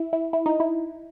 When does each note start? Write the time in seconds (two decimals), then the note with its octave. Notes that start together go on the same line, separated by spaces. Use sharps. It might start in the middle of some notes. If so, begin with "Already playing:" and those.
Already playing: E4
0.13 E4
0.33 E4
0.46 D#4
0.60 E4